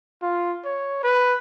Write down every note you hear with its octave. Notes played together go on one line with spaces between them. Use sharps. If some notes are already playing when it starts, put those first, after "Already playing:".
F4
C#5
B4